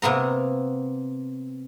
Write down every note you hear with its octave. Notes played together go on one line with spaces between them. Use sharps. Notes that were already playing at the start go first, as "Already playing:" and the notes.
C3 A#3 B3 A#5